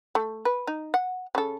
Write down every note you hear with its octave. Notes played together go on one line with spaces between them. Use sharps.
A3
B4
D#4
F#5
C#3 A4